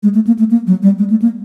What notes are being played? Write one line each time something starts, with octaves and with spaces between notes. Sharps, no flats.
G#3
A3
A#3
A3
A#3
F#3
G3
G#3
A3
A#3